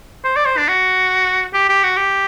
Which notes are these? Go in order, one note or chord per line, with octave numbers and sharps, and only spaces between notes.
C5
D5
C5
D4
F#4
G4
G4
F#4
G4